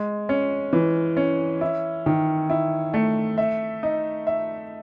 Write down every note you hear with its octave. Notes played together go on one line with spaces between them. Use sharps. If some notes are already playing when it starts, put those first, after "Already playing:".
Already playing: G#3
C#4
E3
C#4
E4
D#3
E4
A3
E5
D#4
E5